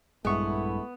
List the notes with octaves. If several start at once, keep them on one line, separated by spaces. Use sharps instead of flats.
A#1 G2 G#3 A3 B3 E4 C#6